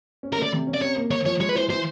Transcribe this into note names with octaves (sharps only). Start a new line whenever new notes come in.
C#4
A#4
A3
D5
C3
C#4
D5
C3 C#5
A#3
A#3 C#5
F3 C#5
G#3 C#5
B4
E3 C5
E3 C5